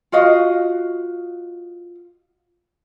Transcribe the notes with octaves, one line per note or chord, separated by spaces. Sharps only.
F4 F#4 D#5 F5